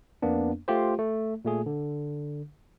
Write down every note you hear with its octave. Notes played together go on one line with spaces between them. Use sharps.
F2 A#3 B3 D4
A3 F4 G4 C5
A3
A#2 A3 G#4
D3